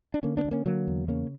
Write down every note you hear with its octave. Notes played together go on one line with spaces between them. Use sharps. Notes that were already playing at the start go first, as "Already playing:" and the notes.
D4
D3 A#3 C#4
B3 D4
D2
A#3 C#4
D3 F#3 A#3
E2
C#3 A#3 C#4